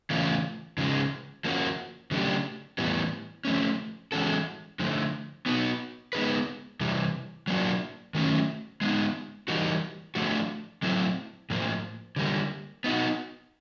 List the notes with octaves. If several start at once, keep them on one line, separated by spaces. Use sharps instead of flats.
C#3 E3 A3 C#4 F4
C#3 F3 G#3
F3 A#3 C#4 F#4
C#3 F#3 A3 D4 G4
A2 E3 G3 B3
F3 A3 C#4
E3 G#3 C#4 F#4 A4
D3 F3 A3
B3 D#4 F#4 B4
G#3 B3 D#4 G#4 B4
C3 E3 G3
F#3 A#3 D4 F#4
D#3 F#3 A3 C#4
G#3 B3 D#4
E3 G3 A#3 D#4 F#4
F3 A3 D4 F#4
F#3 A3 C4 E4
A2 F3 A#3
D3 G3 A#3
B3 D#4 F#4